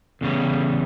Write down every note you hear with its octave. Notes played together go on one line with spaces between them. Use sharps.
E2 C#3 G3